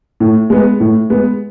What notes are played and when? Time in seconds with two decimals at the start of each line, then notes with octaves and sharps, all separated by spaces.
0.20 A2
0.50 G#3 B3
0.80 A2
1.10 G#3 B3